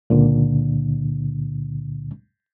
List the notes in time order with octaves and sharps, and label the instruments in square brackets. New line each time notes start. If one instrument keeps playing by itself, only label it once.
[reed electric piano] C#2 A#2 D3